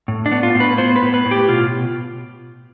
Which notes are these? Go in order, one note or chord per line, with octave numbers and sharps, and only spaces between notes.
A2
D4
B3
F4
A2
B4
B3 C5
B4
A2
B4
A2
G4
B2 F4